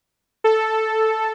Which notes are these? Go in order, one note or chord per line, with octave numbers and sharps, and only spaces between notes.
A4